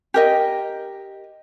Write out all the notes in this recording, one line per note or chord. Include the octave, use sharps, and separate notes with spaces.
G4 A#4 D#5